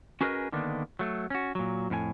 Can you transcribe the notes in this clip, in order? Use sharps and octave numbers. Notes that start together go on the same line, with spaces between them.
C#4 F#4 G#4 A#4 B4 D#5
D3 D#3 A#3 B3 D4
F#3 A3
C#4 F#4
A#2 F#3
F2 A2 E4 G#5